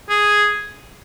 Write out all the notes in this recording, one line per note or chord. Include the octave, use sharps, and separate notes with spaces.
G#4